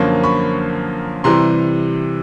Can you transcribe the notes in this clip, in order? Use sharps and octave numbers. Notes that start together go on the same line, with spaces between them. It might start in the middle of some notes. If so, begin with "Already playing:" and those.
Already playing: F#2 D3 F3 A#3 C#4
B5 C#6
C3 E3 G3 A#5 C6